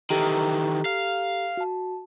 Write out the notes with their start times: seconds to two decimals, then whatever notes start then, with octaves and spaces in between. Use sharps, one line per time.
0.10 D#3 E3 G4 A4 A#5
0.86 F5
1.57 F#4 A5